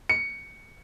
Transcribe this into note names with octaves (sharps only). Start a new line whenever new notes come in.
C#7